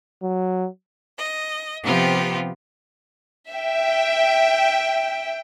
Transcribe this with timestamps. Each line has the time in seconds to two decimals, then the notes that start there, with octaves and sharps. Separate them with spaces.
0.23 F#3
1.15 D#5
1.84 C3 F3 B3 C4 F4 G4
3.50 E5 G5